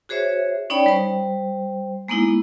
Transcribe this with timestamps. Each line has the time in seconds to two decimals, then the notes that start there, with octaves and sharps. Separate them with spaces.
0.09 F#4 G#4 C5 C#5 E5
0.70 C#4 D#4 C#5 D5 G5 B5
0.86 G3 C5
2.08 G#3 A#3 B3 D#4 E4